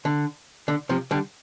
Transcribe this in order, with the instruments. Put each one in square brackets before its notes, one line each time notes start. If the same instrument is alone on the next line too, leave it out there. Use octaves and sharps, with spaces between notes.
[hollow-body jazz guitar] D3
D3
C3 F3
D3 G3